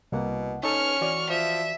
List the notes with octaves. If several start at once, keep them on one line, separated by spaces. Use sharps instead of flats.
C2 B2 A#3 F#5
C#4 D#4 A4 C#6 F6
E3 F#4 D5
F3 E5